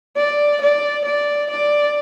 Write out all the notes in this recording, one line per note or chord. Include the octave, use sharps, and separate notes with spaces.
D5
D5
D5
D5